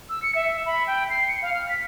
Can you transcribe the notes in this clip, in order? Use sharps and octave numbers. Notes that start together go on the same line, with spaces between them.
E6
C#7
E5
B5
G5
C7
C#7
F5
F6
B6